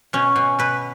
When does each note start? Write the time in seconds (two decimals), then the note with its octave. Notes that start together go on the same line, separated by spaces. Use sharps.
0.13 B2 C#4
0.36 B2
0.59 B2 B4